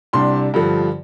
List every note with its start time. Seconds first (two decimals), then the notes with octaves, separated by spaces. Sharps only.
0.13 C2 C3 G3 D4 C6
0.54 G2 D3 F3